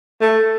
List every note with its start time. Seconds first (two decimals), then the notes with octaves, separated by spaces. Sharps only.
0.21 A3